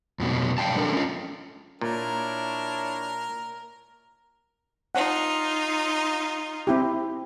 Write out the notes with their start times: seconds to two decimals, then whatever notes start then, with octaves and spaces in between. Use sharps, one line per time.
0.20 F2 B2 F#3
0.58 F#3 F5 G5 A5
0.76 F#3 D4 A4 A#4
0.93 C#4 F4
1.81 A#2 D4 E4 A#4 C#5
4.95 D#4 F4 F#5
6.67 C4 E4 G4